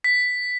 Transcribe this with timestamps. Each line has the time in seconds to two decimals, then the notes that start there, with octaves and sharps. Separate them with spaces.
0.04 B6